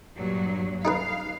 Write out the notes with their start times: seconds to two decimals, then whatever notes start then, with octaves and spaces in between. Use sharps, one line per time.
0.15 G2 A#2 F#3
0.85 D#4 G#4 B4 F5